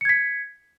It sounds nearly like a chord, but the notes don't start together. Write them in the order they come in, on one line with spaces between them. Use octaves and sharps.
C#7 G#6 B6